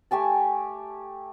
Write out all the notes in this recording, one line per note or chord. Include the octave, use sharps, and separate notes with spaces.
A3 G4 G#5 A5